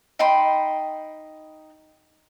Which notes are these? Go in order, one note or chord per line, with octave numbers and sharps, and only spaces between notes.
D#4 G5 B5 C6